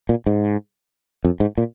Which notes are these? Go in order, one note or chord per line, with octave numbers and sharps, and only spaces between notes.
A#2
G#2
F2
G#2
A#2